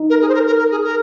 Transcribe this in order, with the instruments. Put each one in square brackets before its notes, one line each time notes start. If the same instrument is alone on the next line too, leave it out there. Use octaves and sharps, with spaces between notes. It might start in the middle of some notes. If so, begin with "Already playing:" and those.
Already playing: [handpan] D#4
[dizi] A#4
G#4
C5
A#4
A#4
A#4
G#4
A#4